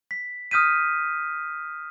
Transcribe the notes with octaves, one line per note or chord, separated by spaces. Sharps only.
B6
D#6 F6 G6 B6 D#7